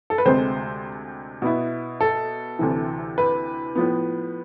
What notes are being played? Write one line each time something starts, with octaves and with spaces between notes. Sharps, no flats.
A4
B4
D2 C3 G#3 C4 C5
B2 B3 E4
A4
D2 C3 E3
B4
A2 F3 B3